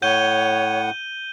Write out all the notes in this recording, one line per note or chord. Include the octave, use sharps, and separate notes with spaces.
A2 C#5 F#5 G6 D#7 G7